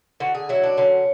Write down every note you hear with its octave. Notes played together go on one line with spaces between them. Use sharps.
D3 F#4
G#4
F#3 E4
D4
D3 C#4